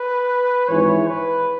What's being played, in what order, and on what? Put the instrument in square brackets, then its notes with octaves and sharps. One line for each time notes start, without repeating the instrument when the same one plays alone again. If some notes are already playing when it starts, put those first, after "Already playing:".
Already playing: [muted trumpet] B4
[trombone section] G#1 G#2 E3 [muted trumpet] C#5
[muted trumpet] B4